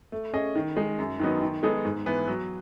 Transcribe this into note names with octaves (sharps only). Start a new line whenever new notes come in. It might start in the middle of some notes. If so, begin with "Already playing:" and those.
A3
C#4 G#4 D#5
D#3
G#3 D#4
F#2
D#3 F#3 B3 D#4
D#3
G#3 B3 D#4 A4
G#2
E3 B3
F#3